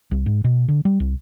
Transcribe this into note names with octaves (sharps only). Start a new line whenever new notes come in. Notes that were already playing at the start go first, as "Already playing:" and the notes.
C2
G#2
B2
D3
G3
C2